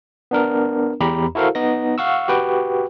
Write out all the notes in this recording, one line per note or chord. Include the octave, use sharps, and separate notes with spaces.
B3 D4 A#4
E2 G4 A#5 B5
E4 F#4 A4 A#4 C5 F5
B3 D#4 A#6
F5 F#5 C#6 E6
F#4 G4 B4 G5